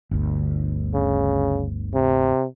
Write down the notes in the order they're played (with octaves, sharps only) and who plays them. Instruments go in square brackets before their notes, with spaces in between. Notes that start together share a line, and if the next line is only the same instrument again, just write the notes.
[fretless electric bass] G1 D2
[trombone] C#3
C3